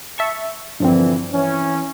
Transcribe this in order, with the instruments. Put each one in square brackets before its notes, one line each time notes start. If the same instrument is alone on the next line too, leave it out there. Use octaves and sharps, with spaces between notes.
[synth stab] E5 A5 C#6
[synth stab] G2 F3 C4 [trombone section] A#2 D3 E3
[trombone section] E3 C#4